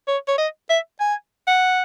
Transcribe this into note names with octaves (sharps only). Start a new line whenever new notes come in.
C#5
C#5
D#5
E5
G#5
F#5